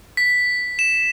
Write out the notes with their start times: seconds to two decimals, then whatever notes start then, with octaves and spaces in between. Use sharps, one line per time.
0.17 B6
0.79 E7